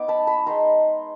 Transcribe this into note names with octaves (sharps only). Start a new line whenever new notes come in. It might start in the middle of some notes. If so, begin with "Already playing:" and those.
Already playing: B3 D#4 D6
A5 B5
A5 B5
G#3 B3 D#4 A#5 C6